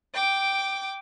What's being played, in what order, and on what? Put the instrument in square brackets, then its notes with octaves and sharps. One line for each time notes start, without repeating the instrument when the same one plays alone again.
[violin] G5 D6